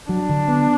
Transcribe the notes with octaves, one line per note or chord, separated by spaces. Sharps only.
F#3 D4
D3
B3